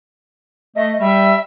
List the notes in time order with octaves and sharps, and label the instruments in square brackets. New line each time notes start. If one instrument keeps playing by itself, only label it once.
[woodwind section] A3 [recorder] D#5
[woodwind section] G3 [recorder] E5